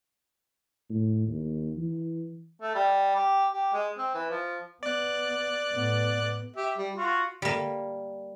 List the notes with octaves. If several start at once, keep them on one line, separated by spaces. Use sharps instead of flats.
A2
D#2
E3
A3
G3
G4
G4
G#3
C4
E3
F3
B3 D5 F#6
A2 B3
G4 E5
G3
F4 F#4
G3 A#3